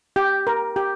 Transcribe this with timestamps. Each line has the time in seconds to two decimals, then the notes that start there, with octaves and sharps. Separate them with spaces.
0.16 G4
0.47 A#4
0.76 G4